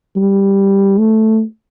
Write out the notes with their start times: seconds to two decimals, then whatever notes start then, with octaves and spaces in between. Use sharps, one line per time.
0.16 G3
0.99 A3